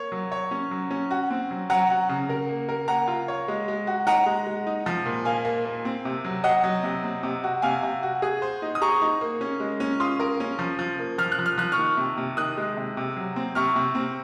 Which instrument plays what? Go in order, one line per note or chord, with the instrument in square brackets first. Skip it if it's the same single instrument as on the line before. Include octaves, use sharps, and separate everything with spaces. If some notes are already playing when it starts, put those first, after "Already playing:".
Already playing: [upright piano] A#3 C#5
F#3
C#5
C#4
F#3
C#4
F#4
C4
F#3
[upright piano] F#3 [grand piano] F#5 A#5
[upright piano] F#4
C#3
A#4
A#3
A#4
[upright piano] A#3 [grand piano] F#5 A#5
[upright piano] F4
C#5
G#3
G#3
F#4
[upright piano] D#4 [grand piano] F#5 A#5
[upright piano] G#3
G#3
D#4
F3
A#2
[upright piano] A#3 [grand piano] F5 G#5
[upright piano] A#3
A#3
C4
C3
F#3
[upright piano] F#4 [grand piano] D#5 F#5
[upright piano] F#3
C3
C4
C3
F#4
[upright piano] C3 [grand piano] F5 G#5
[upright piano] C3
F#4
G#4
C5
D#4
[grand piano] D#6
[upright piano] G#4 [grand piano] A#5 C#6
[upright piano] D#4
A#3
C#4
G#3
C#4
[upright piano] F4 [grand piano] C6 D#6
[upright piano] A#4
C#4
F3
F3
A#3
[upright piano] F3 [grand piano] F6
[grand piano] F#6
[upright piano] F3
[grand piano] F6
[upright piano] F3 [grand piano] F#6
[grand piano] C#6 F6
[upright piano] D#3
C3
C3
[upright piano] D#3 [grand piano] D#6 F#6
[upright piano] G#3
C3
C3
F#3
C4
[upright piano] C3 [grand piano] C#6 F6
[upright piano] C3
C4